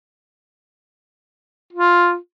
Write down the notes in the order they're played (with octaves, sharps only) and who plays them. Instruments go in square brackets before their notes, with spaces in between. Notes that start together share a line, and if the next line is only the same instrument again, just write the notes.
[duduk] F4